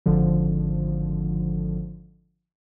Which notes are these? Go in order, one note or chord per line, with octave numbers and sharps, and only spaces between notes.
G#1 D3 F3